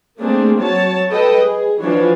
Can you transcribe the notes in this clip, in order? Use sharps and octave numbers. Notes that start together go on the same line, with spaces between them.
A3 A#3 C4 D4 G#4
F#3 C#5 A5
A4 B4 D#5 G5
G#4
E3 F3 D4 F#4 C#5